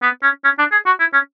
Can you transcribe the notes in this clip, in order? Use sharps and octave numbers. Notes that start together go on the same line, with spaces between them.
B3
C#4
C#4
D4
G#4
F#4
E4
C#4